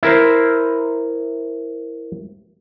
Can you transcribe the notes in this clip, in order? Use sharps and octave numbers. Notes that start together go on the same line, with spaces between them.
E4 A#4 C5